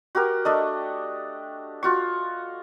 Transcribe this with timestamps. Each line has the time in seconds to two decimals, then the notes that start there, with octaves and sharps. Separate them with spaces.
0.15 F#4 G4 A#4
0.45 A3 D4 D#5
1.83 F4 F#4 C#6